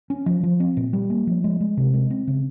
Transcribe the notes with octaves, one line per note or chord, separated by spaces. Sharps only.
C#4
F3
F3
C4
A#2
G3
A#3
F3
G#3
G#3
C3
G#3
C4
C#3